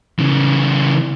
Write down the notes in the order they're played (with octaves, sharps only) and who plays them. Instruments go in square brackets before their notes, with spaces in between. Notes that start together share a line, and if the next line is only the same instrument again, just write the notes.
[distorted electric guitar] C#3 E3